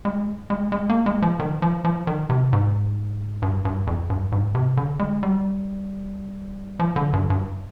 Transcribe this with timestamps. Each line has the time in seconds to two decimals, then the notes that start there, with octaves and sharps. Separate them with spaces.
0.05 G#3
0.50 G#3
0.72 G#3
0.90 A#3
1.06 G#3
1.22 F3
1.40 D#3
1.62 F3
1.85 F3
2.07 D#3
2.30 C3
2.53 G#2
3.42 G2
3.65 G2
3.87 F2
4.10 G2
4.32 G#2
4.55 C3
4.77 D3
4.99 G#3
5.23 G3
6.79 F3
6.96 D3
7.13 G2
7.30 G2